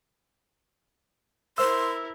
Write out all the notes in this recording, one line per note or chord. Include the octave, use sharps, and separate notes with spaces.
E4 A#4 C5 E5 C6 E6